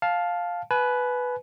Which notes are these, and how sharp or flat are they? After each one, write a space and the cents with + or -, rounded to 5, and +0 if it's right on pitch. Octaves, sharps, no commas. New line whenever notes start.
F5 +10 A5 -10
B4 +0 G#5 +40